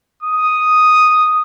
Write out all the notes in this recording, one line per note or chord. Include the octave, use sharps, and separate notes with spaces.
D#6